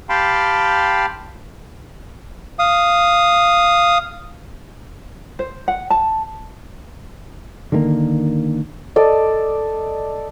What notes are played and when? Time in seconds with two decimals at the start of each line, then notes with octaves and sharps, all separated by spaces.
0.09 G4 F5 G5 A5 B5 C6
2.59 F5 D#6
5.39 C5
5.68 F#5
5.90 A5
7.72 D3 D#3 G#3 A#3
8.96 A4 D5 D#5